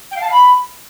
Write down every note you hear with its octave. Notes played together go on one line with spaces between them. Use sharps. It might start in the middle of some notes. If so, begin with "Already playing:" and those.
G5
F5
A5
F5
B5